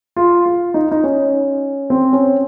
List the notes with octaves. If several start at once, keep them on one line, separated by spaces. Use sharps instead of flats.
F4
F4
D#4
D#4
C#4
C4
C#4